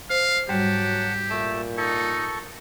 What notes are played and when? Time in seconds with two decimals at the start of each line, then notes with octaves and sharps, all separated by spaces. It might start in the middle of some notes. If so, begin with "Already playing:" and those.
0.10 C5 F5
0.49 G#2 F#3 G3 G4 F#5 A5
1.30 A#2 A3 A5
1.77 D#4 A4 C#6